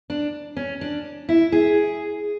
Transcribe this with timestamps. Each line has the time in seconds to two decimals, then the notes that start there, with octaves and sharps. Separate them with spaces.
0.10 D4
0.57 C#4
0.81 D4
1.29 E4
1.52 G#4